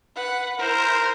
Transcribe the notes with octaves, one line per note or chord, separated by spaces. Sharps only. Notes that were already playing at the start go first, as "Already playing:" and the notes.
B4 F#5
E4 A#4 C5